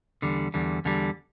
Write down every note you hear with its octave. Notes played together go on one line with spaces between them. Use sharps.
E2 D3 G3
E2 D3 G3
E2 D3 G3